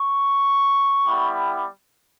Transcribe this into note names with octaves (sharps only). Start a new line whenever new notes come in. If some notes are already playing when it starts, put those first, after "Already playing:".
Already playing: C#6
G3 B3 E4 G4